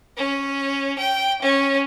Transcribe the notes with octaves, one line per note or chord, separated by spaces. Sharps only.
C#4
G5
C#4